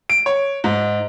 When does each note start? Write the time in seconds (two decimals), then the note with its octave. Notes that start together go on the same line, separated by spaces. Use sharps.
0.10 D7
0.26 C#5
0.64 G#2